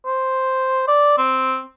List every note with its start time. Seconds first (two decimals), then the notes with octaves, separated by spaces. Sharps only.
0.06 C5
0.88 D5
1.18 C4